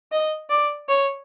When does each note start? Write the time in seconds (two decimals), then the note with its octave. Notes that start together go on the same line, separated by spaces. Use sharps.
0.12 D#5
0.50 D5
0.89 C#5